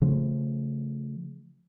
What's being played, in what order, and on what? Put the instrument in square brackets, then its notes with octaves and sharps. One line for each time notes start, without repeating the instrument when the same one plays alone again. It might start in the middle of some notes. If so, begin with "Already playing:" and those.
[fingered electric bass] C#3 F3 A3